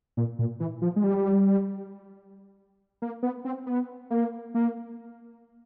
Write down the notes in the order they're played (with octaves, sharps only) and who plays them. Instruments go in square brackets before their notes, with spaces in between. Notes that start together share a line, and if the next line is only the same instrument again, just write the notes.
[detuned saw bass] A#2
A#2
E3
F3
G#3
G3
A#3
B3
C4
B3
A#3
A#3